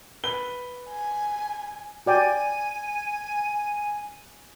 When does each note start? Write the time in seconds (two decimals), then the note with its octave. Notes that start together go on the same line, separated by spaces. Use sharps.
0.24 B4 G7
0.88 G#5
2.06 F#4 D5 G5 G#5